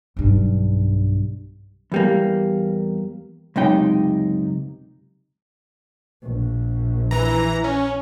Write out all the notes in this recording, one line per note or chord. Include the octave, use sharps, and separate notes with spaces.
B1 G2
E2 G3 A#3
C#2 F#2 C3 D#4 G5
A#1
E3 A#5
C#4